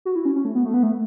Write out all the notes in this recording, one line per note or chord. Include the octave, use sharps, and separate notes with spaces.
F#4
E4
C#4
C#4
A3
B3
A3
B3
A3